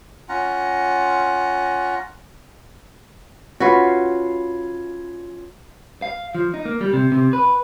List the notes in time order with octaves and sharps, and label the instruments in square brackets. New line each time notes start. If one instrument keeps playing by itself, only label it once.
[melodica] C#4 F4 F#5 A#5
[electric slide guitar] C#4 F4 [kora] F#4 B4
[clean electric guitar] F5
F3
D#4
A#3
G3
C3
C3
B4